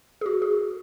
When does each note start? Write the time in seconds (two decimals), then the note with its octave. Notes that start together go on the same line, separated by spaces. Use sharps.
0.21 G#4
0.26 F#4
0.42 G#4